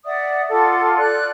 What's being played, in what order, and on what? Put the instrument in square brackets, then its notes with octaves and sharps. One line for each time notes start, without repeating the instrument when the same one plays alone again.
[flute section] D5 E5 F#5 D#6
F4 A4 F#5 D6
D5 F#6